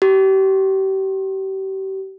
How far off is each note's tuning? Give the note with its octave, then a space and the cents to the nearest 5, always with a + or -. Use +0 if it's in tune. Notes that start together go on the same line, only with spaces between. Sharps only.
G4 -35